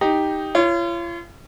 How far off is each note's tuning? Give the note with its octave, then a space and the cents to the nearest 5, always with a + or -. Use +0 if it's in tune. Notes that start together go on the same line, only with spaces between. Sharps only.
D#4 +0 G4 +0
F4 -40 C#5 +0